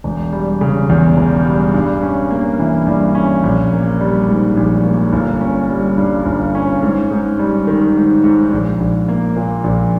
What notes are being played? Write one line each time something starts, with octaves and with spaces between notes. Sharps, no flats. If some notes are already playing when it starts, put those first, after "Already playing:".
E1
G3
C#3
E2
E1
G3
G2
C#4
A#3
E3
G2
C#4
A#1
A#3
G3
G#2
A#1
A#3
G1
C#4
G3
G2
G1
C#4
G#2
G#2
G3
D#3
G#2
G#2
A#1
A#1
A#3
A#2
A#1